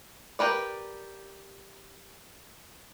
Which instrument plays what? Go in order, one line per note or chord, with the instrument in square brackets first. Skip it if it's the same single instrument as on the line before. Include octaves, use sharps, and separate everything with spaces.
[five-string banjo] G4 A#4 B4 D5